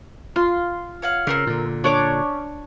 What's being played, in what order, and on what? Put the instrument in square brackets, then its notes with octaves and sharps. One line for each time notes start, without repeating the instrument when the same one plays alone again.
[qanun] F4 [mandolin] C6
[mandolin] C#5 F5 F#5
[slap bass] C#3 [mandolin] C4 A#4 F6
[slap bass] A#2 D3
[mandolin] C#4 D5 [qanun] D4 C#5 D6